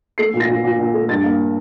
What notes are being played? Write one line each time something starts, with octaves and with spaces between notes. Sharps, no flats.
A3 C7
A#2
A#6
A#2
A#2
A#2
A3
G2 A6
A#3